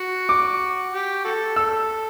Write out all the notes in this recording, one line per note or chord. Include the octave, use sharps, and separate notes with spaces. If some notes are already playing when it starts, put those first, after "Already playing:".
Already playing: F#4
D6
G4
F#4 A4
A4 E6